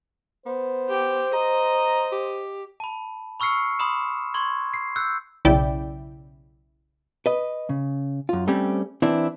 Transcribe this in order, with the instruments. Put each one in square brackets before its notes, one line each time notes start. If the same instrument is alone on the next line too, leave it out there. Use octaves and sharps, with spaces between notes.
[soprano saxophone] B3 [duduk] C5
[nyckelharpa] G4
[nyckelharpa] D#5 [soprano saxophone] A#5
[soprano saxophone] G4
[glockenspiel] A5 B5
B5 C#6 E6 F6 C7 C#7
B5 C6 D#6 E7
C6 C#6 G#6
C7
E6 F#6 G6 C#7
[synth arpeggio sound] B1 C#3 E4 D5 G5
[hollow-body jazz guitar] B4 D#5
C#3
F#2 F4
G3 A3 C4 C#4 G4
E3 C4 D4 E4